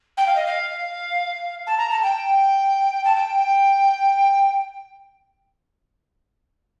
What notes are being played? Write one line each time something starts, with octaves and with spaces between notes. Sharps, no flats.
G5
F5
D#5
F5
A5
A#5
A5
G5
A5
G5